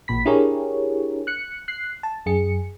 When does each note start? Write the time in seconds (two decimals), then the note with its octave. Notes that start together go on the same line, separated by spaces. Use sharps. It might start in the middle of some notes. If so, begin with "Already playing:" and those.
0.08 A1 A#2 B5 B6
0.25 D4 E4 G4 G#4 A#4 C#5
1.27 F#6 C#7
1.68 F#6 C7
2.03 A5
2.26 F#2 G#4 C#7